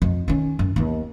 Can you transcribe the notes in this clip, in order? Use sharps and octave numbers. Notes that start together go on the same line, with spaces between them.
F2
D#3 C#4
F#2
D#2 B3